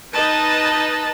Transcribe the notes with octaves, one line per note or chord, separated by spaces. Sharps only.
D#4 B4 D#5 A5